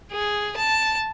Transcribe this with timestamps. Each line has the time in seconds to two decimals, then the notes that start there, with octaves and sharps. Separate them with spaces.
0.12 G#4
0.57 A5